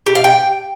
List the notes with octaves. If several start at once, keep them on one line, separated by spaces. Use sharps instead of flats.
G4
F5
G5